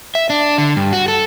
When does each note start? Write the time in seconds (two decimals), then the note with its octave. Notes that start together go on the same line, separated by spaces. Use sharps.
0.15 E5
0.30 D4
0.58 D3
0.77 G2
0.93 F#4
1.08 A4